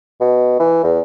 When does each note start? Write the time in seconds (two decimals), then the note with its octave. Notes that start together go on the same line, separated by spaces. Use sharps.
0.21 B2
0.60 E3
0.84 E2